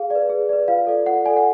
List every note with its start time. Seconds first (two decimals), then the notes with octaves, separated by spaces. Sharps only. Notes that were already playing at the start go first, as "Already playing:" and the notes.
Already playing: G#4 F5
0.10 D5
0.15 B4
0.30 G#4
0.49 B4 D5
0.68 F4 F5
0.87 A4 D5
1.06 F4 F#5
1.24 A4 D5 G#5
1.37 F#5